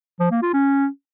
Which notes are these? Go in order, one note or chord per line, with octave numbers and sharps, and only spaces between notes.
F3
A#3
F4
C#4